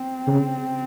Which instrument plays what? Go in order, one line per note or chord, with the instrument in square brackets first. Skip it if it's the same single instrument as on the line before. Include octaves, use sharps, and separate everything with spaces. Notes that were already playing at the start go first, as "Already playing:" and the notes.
Already playing: [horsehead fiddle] C4
[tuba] C#3